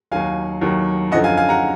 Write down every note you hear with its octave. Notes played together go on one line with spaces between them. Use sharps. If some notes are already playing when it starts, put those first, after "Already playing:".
D#2 D#3 F#3 F5 G#5
D#2 D#3 F#3
F#2 D3 F3 D#5 F#5
F5 G#5
F5 G#5
F#5 A#5